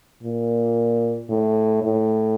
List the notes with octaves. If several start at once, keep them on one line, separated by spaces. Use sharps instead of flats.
A#2
A2
A2